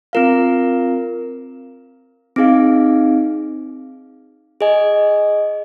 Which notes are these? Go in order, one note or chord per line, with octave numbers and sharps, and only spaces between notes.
C4 F4 A#4 F5
C4 D#4 G#4 F5
G#4 D#5 G#5